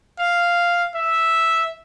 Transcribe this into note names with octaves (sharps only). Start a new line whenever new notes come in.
F5
E5